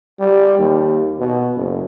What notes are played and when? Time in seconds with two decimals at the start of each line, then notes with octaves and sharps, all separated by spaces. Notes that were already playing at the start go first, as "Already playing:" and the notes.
0.19 G3
0.59 D#2
1.19 B2
1.56 F#1